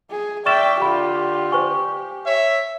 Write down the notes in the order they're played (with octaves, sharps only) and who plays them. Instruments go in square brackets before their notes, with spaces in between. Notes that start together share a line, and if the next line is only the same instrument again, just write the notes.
[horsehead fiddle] G#4
[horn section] D5 E5 [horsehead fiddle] G5 [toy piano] C#6 [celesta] F6 A6 E7
[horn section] D3 F4 [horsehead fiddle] G4 [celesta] B5
[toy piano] C5 C#6 [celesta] G#5
[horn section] C#5 E5